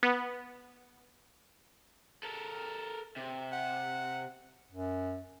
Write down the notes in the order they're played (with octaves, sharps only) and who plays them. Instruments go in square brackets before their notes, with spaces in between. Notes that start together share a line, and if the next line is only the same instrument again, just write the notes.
[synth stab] B3
[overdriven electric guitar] A4 A#4
C3
[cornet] F#5
[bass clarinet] F#2